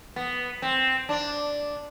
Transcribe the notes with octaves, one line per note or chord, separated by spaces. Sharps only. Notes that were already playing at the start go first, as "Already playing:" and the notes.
B3
C4
D4